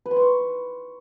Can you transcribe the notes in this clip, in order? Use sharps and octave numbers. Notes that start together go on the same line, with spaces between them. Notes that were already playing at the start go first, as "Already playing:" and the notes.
B4
C6
C#6